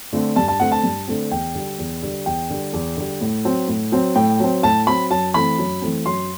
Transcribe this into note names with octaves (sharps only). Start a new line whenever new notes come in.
D3 A3 C4
G2 A5
A5
D3 A3 C4 F#5
A5
G2
D3 A3 C4
E2 G5
D3 G3
E2
D3 G3
E2 G5
D3 G3
E2
D3 G3
A2
F#3 C4
A2
F#3 C4
A2 G5
F#3 C4
A2 A5
F#3 C4 B5
F#2 A5
E3 A3 C4 B5
F#2
E3 A3 C4
F#2 C6